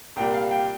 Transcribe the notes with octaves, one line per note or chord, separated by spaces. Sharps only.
C2 A#2 G3 G5
F5
G5